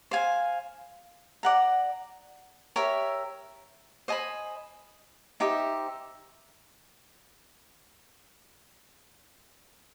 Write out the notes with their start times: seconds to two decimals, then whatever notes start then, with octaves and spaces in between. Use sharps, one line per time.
0.11 C5 F5 G#5
1.43 D5 F#5 A#5
2.76 G4 A#4 C#5 E5
4.08 C5 D#5 G#5 B5
5.40 D#4 G4 C5 E5